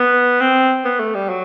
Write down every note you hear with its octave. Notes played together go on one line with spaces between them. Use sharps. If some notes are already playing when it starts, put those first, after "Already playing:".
Already playing: B3
C4
B3
A3
G3
F#3